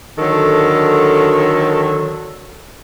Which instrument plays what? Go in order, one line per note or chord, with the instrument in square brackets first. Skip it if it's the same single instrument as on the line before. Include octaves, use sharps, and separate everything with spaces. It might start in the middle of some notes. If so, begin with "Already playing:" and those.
[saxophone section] D3 D#3 F#3 A4